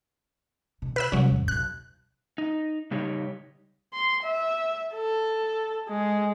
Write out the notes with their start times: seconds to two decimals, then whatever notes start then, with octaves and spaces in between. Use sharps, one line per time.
0.82 B2 D#3
0.96 B4 E6 F#6
1.12 C3 F#3 G3 C#4
1.30 A1 F2
1.48 B1 F#6
2.38 D#4
2.91 C#3 G3 D#4 G4 C#5
3.94 C6
4.23 E5
4.95 A4
5.89 G#3